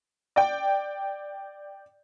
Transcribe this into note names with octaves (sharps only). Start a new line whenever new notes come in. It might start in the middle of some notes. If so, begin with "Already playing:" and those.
D5 G5